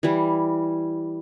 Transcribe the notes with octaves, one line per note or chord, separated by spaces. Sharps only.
E3 G3